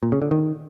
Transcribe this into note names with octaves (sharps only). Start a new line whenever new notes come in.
A#2
C#3
D3
D#3